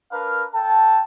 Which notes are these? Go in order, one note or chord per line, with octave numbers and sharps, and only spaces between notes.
D4 A#4 B4 F5
A4 G5 A5